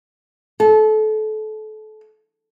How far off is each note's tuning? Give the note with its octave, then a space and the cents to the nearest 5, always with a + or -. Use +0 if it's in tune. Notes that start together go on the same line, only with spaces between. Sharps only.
A4 -30